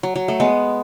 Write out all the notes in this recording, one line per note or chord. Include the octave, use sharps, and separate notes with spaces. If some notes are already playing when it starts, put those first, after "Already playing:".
F#3
F#3
A3
G#3 B3